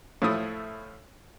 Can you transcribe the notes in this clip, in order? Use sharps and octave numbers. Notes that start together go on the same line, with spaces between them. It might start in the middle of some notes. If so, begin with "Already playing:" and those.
A2 F3 A3 E4 D#6